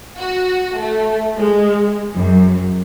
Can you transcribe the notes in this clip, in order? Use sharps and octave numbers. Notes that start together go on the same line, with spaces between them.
F#4
A3
G#3
F#2